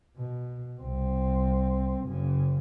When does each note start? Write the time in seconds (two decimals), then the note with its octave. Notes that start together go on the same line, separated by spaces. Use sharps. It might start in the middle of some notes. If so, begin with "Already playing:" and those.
0.17 B2
0.80 C2 C4
2.03 F#1 C#3